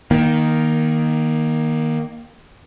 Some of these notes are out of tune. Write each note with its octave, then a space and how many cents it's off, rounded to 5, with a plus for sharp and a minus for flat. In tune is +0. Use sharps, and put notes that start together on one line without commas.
D#3 +0 A#3 +20